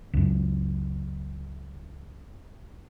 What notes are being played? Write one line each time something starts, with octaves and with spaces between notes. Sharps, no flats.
C#2 F#2